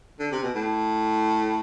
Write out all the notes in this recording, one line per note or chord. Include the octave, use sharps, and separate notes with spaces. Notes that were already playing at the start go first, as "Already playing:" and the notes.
D3
C3
B2
A2